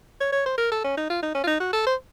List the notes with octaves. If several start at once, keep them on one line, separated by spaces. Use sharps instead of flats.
C#5
C#5
C5
A#4
A4
C#4
D#4
F4
D#4
C#4
F4
D#4
F#4
A4
C5